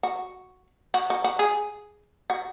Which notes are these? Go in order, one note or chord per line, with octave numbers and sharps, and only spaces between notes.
F#4
F#4
F#4
F#4
G#4
F#4